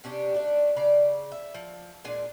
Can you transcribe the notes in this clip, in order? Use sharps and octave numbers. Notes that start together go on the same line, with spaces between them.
C3 C#4 D4 G4
A3 D4
C#3 D5 A#5
E5
F3
A#2 G#3 D4 G#5